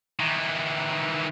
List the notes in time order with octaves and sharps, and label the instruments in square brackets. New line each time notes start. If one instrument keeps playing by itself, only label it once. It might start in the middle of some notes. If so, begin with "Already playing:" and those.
[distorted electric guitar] D#3 E3